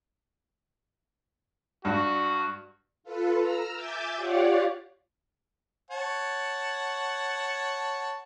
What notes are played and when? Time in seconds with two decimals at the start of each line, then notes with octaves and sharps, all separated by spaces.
1.85 G2 F#4
3.04 F4 A4 B4
3.38 A#5 E6 F6
3.75 E5 G#5 D6 G6 A6
4.16 F4 G4 C#5 D5 F5 F#5
5.90 C#5 F#5 A5